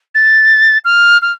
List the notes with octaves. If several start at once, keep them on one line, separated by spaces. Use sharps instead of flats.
A6
F6
F6